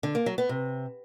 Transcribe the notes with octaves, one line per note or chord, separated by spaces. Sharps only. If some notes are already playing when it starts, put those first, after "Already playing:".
D3
A#3
F#3
B3
C3